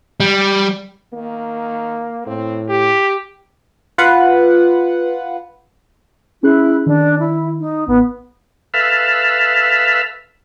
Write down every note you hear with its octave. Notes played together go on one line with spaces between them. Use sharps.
G3
D#3 A#3
A2 C4
G4
F4 B4 F#5
C#4 E4 G#4 F#6
D#3 D4
E4
D#4
A1 B3
A4 B4 E5 F5